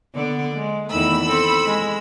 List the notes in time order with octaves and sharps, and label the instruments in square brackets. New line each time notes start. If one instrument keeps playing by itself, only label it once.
[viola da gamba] D3 B3 D5
G#3
[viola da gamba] E2 D#3 A3 [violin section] B5 E6
[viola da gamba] C4 A4
G#3